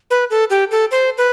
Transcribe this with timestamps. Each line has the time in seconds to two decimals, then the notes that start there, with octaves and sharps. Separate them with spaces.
0.11 B4
0.30 A4
0.50 G4
0.71 A4
0.91 C5
1.18 B4